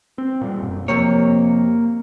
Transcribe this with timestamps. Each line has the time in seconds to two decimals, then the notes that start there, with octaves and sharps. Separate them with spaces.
0.18 C4
0.41 A#2 G3
0.62 E1 F#2
0.88 F2 C3 A#3 C#5